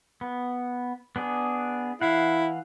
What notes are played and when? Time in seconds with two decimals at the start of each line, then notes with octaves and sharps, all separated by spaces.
0.21 B3
1.16 B3 D4 G#4
2.01 E3 E4 F5 F#5